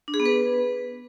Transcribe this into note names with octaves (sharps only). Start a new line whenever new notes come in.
D4
G#4
B3
B4